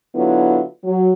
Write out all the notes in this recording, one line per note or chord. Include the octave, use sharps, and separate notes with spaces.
D3 F#3 B3 E4 F4
F#3